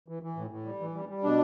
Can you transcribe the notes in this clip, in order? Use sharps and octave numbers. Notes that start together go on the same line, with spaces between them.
E3
E3
A2
A2
G3
E3
G3
G3
B2 D4